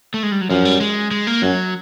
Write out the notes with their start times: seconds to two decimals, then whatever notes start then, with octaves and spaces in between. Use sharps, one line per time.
0.14 A3
0.23 G#3
0.32 G3
0.41 F#3
0.50 F#2 F3
0.65 G3
0.80 G#3
1.11 G#3
1.27 A#3
1.42 F#2 F#3